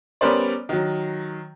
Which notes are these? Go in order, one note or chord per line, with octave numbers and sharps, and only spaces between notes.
G3 B3 C#4 A#4 C5 D5
D#3 F#3